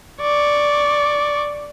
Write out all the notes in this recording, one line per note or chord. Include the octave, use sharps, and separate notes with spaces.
D5 C#6